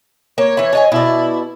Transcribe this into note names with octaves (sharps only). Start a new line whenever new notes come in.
A#3 C#5
E3 E4
D4 D#5 G#5
B2 E4 D5